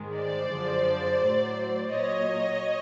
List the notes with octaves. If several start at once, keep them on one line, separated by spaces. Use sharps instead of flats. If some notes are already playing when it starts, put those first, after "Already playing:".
Already playing: G#2 D#3 G#3
C5 D5
F#2 D3 F3 G#3
A2 F#3
A#2 F#3 C#5 D#5